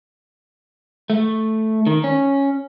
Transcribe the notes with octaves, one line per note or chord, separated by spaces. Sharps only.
A3
D#3
C#4